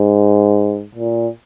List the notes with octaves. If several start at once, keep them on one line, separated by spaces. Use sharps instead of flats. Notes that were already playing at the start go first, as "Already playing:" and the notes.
Already playing: G#2
A#2